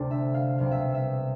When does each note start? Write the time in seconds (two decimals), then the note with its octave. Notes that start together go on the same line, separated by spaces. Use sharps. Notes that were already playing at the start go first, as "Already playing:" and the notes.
Already playing: D2 C3 A3 C5 D5
0.11 E5
0.34 F5
0.59 C2 B2 G3 C4 F5
0.71 E5
0.95 E5